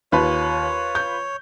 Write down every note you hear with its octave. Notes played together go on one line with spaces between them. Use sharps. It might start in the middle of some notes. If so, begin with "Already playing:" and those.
D#2 F4 B4 C#5 B5
G6